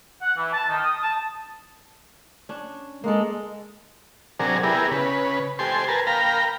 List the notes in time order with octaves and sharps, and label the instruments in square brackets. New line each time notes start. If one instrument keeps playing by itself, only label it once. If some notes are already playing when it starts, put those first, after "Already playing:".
[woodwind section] F#5
E3
A5
D#3
D#6
A5
[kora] C#4 D4
[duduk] G#3 [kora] A#3 A4
[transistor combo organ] C3 F#3 D4 G#4 A#4
B3 E4 G4 G#4 A#4
C#3 B4
G4 A4 C5 G#5 C6
A#4 B4 G#5 A5
A#4 F5 G5 A#5 B5